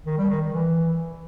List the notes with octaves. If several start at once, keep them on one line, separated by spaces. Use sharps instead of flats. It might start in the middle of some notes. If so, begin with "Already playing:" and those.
D#3
G3
D#3
D#3
E3